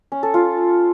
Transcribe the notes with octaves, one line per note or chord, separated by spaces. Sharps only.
C#4
A4
F4